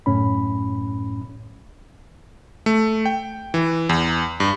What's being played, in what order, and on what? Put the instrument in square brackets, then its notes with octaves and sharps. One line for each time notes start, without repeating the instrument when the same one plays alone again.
[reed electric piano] F#2 A2 C#4 B5
[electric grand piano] A3
G5
E3
E2
G2